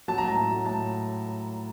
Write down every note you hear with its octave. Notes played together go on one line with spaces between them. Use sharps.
F#3 A5
A#5
A2
A5
A2
F#3
A2 A5